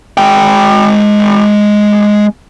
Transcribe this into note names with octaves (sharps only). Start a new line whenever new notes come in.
G#3 G5